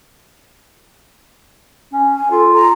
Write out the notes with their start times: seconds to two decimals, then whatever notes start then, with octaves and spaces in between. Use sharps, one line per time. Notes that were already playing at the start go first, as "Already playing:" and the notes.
1.92 C#4
2.16 G#5
2.31 F4 A4
2.54 A#5